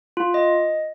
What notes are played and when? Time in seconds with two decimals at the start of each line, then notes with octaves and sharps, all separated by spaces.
0.17 F4
0.34 D#5